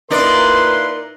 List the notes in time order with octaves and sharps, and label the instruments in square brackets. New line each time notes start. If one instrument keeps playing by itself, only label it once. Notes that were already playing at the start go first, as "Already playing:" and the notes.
[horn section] A#2 E4 C6 [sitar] D#4 D5 [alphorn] A#4 [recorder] B4